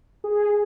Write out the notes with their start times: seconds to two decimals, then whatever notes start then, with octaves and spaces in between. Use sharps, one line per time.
0.24 G#4